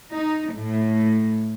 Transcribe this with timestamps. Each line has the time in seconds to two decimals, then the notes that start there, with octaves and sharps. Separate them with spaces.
0.15 D#4
0.55 A2